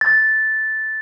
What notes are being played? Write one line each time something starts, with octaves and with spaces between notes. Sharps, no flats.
A6